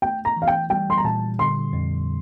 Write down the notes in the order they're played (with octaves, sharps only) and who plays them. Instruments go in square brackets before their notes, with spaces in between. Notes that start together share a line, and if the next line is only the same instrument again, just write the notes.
[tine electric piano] A3 [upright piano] G5
[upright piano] A#5
[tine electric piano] E3
[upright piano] F5
G5
[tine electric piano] G3 [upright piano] G5
[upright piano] C6
A#5
[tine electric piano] A#2 [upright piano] A5
[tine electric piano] D3 [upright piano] C6
[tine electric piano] F2